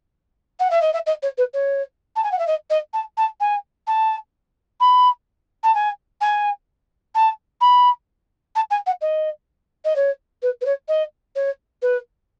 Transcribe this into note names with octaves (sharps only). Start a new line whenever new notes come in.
F#5
E5
D#5
E5
D#5
C#5
B4
C#5
A5
G#5
F#5
E5
D#5
D#5
A5
A5
G#5
A5
B5
A5
G#5
G#5
A5
B5
A5
G#5
F#5
D#5
D#5
C#5
B4
B4
C#5
D#5
C#5
B4